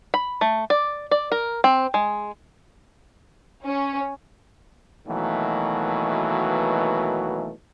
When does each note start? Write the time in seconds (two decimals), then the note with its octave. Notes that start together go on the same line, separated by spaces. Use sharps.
0.14 B5
0.41 A3
0.70 D5
1.11 D5
1.32 A#4
1.64 C4
1.94 G#3
3.65 C#4
5.06 B2 D#3 E3 F#3 A3 A#3